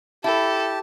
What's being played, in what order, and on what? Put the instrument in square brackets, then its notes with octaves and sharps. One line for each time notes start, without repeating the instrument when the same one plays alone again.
[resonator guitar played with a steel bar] E4 [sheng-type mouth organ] G4 A5 [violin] A4